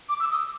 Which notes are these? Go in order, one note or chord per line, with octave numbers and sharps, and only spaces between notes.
D6
E6
D#6